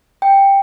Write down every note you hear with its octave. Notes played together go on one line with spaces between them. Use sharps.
G5